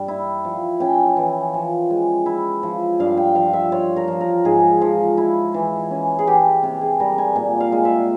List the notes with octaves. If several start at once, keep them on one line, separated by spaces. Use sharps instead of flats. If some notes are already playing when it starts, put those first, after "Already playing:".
Already playing: G2 G3
E4
F3
C#4 G5
E3
F3
G#3
E4
F3
G2 F5
G5
F3 F5
E5
F4 C#5
A#4
F3
A#4
G#2 G#4
F3
E4
E3
C#4
G#4
E3 G4
C3 G4
G#4
G3 A#4
G#5
A#2 G#5
F5
G#3
E5